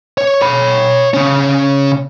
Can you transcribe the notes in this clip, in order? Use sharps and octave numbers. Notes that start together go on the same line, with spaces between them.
C#5
C#5 B5
C#3 C#4